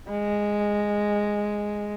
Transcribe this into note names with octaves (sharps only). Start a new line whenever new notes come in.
G#3